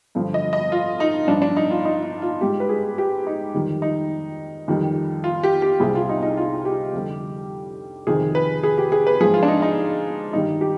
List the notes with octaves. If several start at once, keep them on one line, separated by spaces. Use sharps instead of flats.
G2 D3 F3
D#5
D#5
F4
D#4
G2 F3 D4
D4
D#4
F4
D#4
D#4
F4
G#2 G3 G4
B4
G#4
G4
D#4
F2 D#3 G3
D#4
F2 D#3 G3
F4
G4
G4
C2 C3 G3 G#4
F4
D#4
D#4
F4
G4
F2 D3 G3
F2 C3 D#3 G#4
B4
G#4
G4
G#4
B4
G#2 F3 G#4
F4
D4
D#4
D#4
G2 D#3 G3 D#4
G4